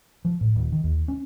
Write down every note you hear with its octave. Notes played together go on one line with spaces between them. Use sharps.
F3
A2
D#1
D#3
D#2
C#4